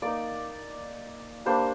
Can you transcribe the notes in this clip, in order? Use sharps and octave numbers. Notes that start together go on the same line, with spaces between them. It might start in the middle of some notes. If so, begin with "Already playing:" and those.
A#3 D#4 D5
G3 A#3 D4 C5